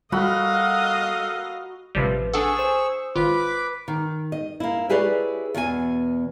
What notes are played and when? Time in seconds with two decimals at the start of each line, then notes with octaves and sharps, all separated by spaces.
0.12 G3 F#4 A4 A#4 D#5 F5 F#5 B5
1.95 A1 C3 F3 G3 B4
2.34 D4 G#4 A4 F#5 G#5 C#6 E6
2.59 C5 E7
3.15 G#1 F4 B4 D6
3.88 D#3
4.32 D#5
4.60 A#3 E4
4.89 E4 G4 G#4 B4 C#5 D5
5.54 E2 B2 G#4 G#5